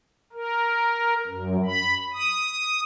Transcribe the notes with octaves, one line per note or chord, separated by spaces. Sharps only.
A#4
F#2
B5
D#6